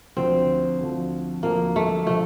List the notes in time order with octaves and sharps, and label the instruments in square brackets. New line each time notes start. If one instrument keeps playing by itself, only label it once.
[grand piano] D2 D3 F3 [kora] C4
[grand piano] D2 D3 F3
[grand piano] D2 D3 F3 [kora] A#3
[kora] A3
[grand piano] D3 F3 [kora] A3